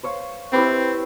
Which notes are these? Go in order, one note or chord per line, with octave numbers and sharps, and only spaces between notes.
C5 C#5 F5
C4 E4 G4 B4